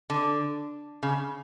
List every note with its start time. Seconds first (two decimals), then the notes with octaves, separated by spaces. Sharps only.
0.10 D3
1.03 C#3